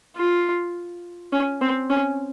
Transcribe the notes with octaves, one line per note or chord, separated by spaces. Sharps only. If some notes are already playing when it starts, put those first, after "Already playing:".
F4
C#4
C4
C#4